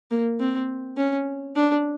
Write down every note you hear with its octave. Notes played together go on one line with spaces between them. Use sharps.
A#3
C4
C#4
D4